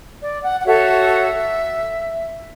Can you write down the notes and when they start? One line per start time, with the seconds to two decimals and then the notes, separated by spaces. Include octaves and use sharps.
0.21 D5
0.43 F#5
0.59 F#5
0.65 F#4 A4 C#5 E5